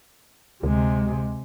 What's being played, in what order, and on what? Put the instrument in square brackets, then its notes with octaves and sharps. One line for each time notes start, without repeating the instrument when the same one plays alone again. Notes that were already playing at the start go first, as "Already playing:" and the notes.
[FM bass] D2 [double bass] C3 G#3